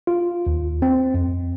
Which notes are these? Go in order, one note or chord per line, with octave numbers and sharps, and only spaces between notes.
F4
D#2
C4
F2